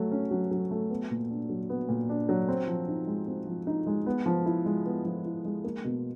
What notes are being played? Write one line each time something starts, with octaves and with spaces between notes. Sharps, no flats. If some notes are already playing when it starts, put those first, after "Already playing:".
Already playing: F#3 A3
C#4
F#3
F#3
A3
B3
A#2
D4
F#3
B3
A#2
D4
F#3
C4
F3
D#4
G#3
C4
F3
D#4
G#3
B3
F3
E4
G#3
B3
F3
E4
G#3
A#3
B2